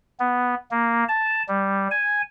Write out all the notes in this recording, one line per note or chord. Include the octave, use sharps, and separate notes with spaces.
B3
A#3
A5
G3
G#5